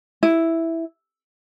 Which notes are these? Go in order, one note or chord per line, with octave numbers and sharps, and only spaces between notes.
E4